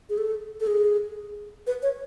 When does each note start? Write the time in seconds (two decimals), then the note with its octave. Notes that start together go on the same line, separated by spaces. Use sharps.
0.10 G#4
0.18 A4
0.60 A4
0.67 G#4
1.67 B4
1.83 C#5